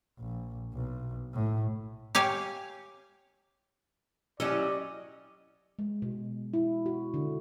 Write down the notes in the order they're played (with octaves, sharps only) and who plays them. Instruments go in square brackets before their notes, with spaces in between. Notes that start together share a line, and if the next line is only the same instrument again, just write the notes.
[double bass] A#1
B1
A2
[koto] G4 C#5 F5 G#5
[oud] F#3 C#4 E4 [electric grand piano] G4 E6 [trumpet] D5 [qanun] D#5
[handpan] G#3
B2
E4
F#4
D3